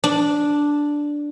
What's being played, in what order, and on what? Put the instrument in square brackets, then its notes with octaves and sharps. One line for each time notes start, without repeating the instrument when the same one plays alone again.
[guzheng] D4